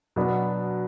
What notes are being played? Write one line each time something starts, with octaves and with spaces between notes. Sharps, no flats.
B2 F#3 B3 D4